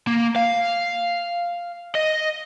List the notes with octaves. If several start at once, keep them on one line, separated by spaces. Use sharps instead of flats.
A#3
F5
D#5